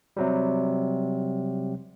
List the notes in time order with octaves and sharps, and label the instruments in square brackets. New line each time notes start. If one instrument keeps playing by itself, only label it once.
[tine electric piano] C3 F#3 G3